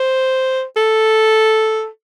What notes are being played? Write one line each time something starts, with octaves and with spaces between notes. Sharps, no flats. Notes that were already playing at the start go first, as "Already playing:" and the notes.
Already playing: C5
A4